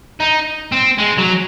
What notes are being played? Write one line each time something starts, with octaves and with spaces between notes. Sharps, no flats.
D#4
C4
G#3
F#3